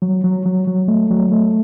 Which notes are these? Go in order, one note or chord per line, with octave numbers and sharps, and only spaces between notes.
F#3
F#3
F#3
F#3
A3
F#3
A3